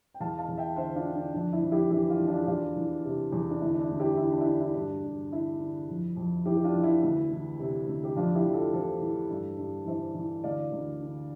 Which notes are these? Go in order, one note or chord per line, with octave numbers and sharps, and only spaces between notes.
G5
E2 F5 A5
F5 A5
E2
E5 G5
D3 C5 E5
D4 F4
D3
D4
F2 D4
E4
F2
E4 G4
E3 E4 G4
D4 F4
E3
D4 F4
G4
E2 D4 F4
E3
C3
E2
D4
D2 E4
D4
E4
D2
E4 G4
D3 E4
D4
E4
D3 D4
E4
G2 D4
G2
D3 E4
D3
F2
F2
E3 E4 G4
G4
D4 F4
E3
E4
D2
E3
C3
D2
G4
F2 D4 F4
E4 G4
F2
F4 A4
E3 A4 C5
E3
G2
G2
E3 C5 E5
E3
D2 D5 F5
D2
D3